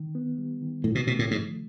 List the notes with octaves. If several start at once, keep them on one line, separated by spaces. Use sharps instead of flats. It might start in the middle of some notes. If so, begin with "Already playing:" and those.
Already playing: D#3
B3
G3
D#3
A2 C#3
B2
B2 A3
A2
G#2 F3